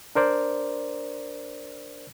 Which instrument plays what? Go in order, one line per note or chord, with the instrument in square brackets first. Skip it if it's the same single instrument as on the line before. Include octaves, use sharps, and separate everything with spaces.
[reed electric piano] D4 A#4 C5 D5